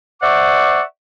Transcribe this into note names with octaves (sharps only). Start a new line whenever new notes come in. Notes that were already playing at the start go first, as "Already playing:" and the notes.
C5 D5 E5 F#5 C#6 D6